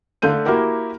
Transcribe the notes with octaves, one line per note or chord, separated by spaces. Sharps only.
D3 A3 F5 G6 D#7
A#3 E4 F#4 G4 A#4